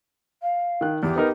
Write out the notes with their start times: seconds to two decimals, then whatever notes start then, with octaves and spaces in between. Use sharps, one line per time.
0.42 F5
0.81 D#3 F#6
1.03 E2 G4
1.16 B3 D#4 A#4